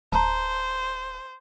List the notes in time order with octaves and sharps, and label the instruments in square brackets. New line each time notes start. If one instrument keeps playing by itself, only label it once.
[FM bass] D1 [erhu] C5 [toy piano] A5 A#5